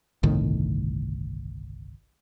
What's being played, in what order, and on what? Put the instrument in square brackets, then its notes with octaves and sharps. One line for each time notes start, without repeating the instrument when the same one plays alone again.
[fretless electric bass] G1 C2 A2 D#3